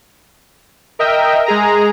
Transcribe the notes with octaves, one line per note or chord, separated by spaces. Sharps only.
A#4 D#5 E5 G5
G#3 G#4 A#5